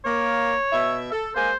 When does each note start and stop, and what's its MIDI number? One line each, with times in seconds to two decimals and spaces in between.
0.05 0.52 58
0.05 1.00 73
0.72 1.10 47
0.72 1.10 76
1.12 1.30 69
1.36 1.51 56
1.36 1.51 58
1.36 1.51 68
1.36 1.56 72